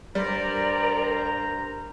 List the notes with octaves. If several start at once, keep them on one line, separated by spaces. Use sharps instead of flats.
G2 G3 A#4 C5 D5 A#5